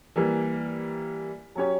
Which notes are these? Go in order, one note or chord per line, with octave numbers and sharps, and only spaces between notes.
E3 G3 A#3
F#3 C#4 G4 C#5